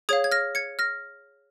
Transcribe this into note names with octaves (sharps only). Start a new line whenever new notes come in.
G#4 C#5 F5 D#6 G#6
G#6
F6 A#6
G#6 C#7
F6 A#6